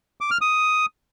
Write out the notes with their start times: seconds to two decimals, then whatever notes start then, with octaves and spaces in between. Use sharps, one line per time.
0.21 D6
0.31 F6
0.41 D#6